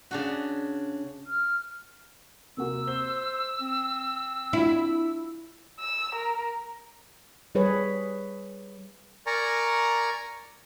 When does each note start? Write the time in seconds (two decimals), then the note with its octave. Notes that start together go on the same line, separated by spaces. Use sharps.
0.11 C#3 D4 F#4
1.27 F6
2.57 C3 A#3 F#4 E6
2.88 C5 G7
3.61 C4
4.53 D4 E4 F4
5.79 E6
6.15 A#4
7.55 G3 G#4 B4 C#5
9.27 A#4 D5 G#5 A#5 C#6